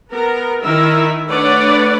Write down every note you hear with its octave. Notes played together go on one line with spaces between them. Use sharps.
B3 A#4
D#3 E4 A#4 E5
A3 D4 B4 C#5 D5 F#5